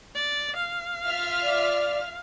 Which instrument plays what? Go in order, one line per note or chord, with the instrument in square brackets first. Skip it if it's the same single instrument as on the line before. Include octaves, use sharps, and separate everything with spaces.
[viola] D5
F5
[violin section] F4 E5 F6
[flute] D5